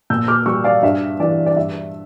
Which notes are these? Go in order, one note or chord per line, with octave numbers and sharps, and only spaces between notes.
A#2 E6 G6
D6 F6
G3 C#6 E6
D5 F5
G2 E5
E3 G3 D5
D5
G2 E5